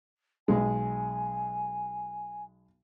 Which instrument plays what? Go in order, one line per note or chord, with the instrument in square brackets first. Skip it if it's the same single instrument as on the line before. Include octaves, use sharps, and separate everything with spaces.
[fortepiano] B1 G#3 [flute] G#5